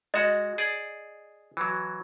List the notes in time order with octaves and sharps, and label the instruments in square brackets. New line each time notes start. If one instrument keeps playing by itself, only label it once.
[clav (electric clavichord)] G#3 F#4 [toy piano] D#5
[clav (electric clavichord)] G#4 D5
E3 F#3